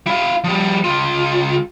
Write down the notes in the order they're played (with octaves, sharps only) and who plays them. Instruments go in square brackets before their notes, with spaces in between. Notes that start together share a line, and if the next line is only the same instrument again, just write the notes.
[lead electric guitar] E4 F5
F3 G3
C#2 F4